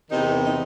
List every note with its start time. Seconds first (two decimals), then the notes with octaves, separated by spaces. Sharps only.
0.10 E2 C3 D#3 D#4
0.45 D#4